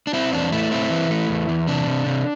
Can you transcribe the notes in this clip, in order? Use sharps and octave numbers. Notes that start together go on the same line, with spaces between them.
D4
C4 E4
E2 D4
A3 E4
C4 E4
E3
A3
E2
E2
C3 D4
C3
C3